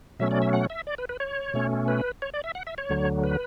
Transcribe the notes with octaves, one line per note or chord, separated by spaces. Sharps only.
B2 F#3 A3 C#4 E5
D5
E5
F#5
E5
D5
B4
B4
C#5
B2 A3 C#4
B4
C#5
D5
E5
F#5
E5
C#5
D2 D3 F#3
B4